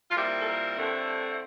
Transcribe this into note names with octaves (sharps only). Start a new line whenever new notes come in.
F4
A#2 G3 C4 E4 G4
A4
A#4
G2 D3 A3 C4 E4